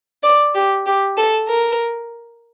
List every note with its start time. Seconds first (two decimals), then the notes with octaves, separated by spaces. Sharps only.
0.23 D5
0.55 G4
0.86 G4
1.17 A4
1.48 A#4